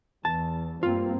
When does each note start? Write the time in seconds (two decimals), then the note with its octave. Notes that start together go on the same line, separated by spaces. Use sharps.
0.25 E2 A5
0.83 G2 A#3 C4 F4